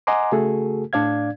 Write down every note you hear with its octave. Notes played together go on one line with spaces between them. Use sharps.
D#5 F#5 G#5 A#5 C6 D6
C#3 A3 F#4 G#4 A4
A2 D4 D5 F5 G#6